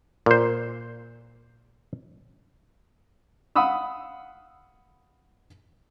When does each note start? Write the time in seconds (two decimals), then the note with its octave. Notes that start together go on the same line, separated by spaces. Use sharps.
0.26 A#2 C5
3.56 F5 F#5 B5 D#6 E6